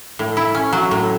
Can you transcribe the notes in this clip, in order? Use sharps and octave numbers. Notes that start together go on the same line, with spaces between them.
A2
E4
C#4
F#3
A2